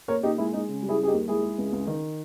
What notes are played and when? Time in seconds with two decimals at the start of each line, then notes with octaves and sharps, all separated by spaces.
0.08 A#2 A#4 C#5
0.23 A#2 D#4 G4
0.38 G#3 E4 G#4
0.53 G#3 D#4
0.68 C#3
0.83 G3
0.89 E4 G#4
0.98 G3
1.03 G#4
1.07 D#4 G4
1.13 D#2
1.28 G#3 E4 G#4
1.42 G#3
1.58 C#2
1.73 C#2
1.87 D#3